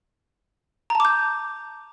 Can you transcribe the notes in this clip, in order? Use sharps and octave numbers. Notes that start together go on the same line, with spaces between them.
A5 A#5 D6 G6